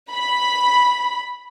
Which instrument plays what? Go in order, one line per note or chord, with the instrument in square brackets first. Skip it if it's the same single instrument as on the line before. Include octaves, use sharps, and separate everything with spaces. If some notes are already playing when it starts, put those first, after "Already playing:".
[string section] B5